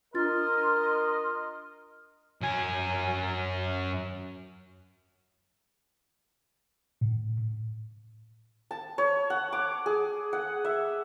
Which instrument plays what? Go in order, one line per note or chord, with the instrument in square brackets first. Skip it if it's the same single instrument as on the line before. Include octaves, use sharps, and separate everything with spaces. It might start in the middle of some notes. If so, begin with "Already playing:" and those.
[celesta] D4 F4 A6 [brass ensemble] A#4 D#5 [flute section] C6 F6
[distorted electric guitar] F#2 G#5
[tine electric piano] A2
[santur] A5
C#5
F#5
D6
G#4
F#5
E5